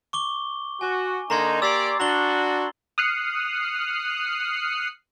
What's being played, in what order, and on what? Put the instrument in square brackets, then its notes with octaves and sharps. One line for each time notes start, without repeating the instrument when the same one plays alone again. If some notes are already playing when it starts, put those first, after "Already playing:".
[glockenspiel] C#6 D6 G7
[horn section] F#4 [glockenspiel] G#5
[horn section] D3 A#3 D#4 [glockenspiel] A#5 C6 G#6
[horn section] A#3 G4 D5 [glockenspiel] E6 A6 C7
[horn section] D4 F#4 [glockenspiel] A#5 F#7 G7
[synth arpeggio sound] D#6 F6 F#6 C7 C#7